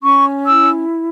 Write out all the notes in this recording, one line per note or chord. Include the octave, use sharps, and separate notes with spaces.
C#4 C#6
E4 E6